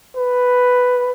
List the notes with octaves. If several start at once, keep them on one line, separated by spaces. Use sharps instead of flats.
B4